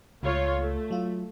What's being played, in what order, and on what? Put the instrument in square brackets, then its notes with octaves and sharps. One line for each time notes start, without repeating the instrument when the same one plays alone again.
[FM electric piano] C#2 [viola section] A3 F4 C#5
[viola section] A3
[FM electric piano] F#3 F4